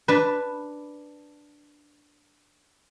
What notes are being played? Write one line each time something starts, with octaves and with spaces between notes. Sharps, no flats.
D4 B4